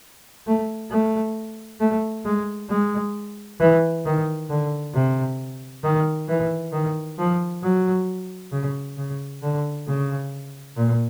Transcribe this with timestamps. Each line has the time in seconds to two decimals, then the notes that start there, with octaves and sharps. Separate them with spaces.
0.47 A3
0.91 A3
1.80 A3
2.25 G#3
2.70 G#3
3.60 E3
4.05 D#3
4.50 D3
4.94 C3
5.84 D#3
6.28 E3
6.73 D#3
7.18 F3
7.63 F#3
8.52 C#3
8.97 C#3
9.42 D3
9.87 C#3
10.77 A#2